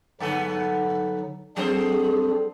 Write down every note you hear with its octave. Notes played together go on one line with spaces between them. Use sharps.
G2 D3 F#3 B3 D#4 A4
F#3 G3 C4 D4 G#4 A4 C5